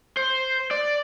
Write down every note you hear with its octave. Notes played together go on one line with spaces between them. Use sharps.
C5
D5